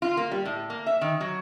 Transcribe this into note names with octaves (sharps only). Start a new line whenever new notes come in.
F4
A#3
G3
A2
A#3
E5
D#3
F#3